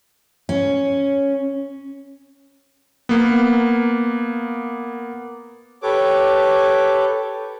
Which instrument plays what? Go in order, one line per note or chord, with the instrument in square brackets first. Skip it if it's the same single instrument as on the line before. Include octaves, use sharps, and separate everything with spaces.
[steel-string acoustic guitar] C#4
[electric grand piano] A#3 B3
[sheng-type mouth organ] G4 A4 B4 C#5 D6